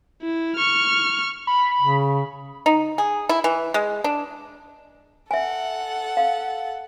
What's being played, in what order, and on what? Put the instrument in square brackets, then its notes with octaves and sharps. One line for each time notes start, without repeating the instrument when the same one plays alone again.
[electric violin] E4
C#6 F6
[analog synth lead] B5
[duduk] C#3
[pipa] D#4
G#4
E4
E3
G#3
D4
[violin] A4 F#5 [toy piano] E5 G#5
[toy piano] F5